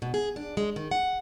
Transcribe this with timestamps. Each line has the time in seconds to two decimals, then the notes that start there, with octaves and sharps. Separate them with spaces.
0.02 B2
0.14 G#4
0.36 D4
0.57 G#3
0.76 D#3
0.91 F#5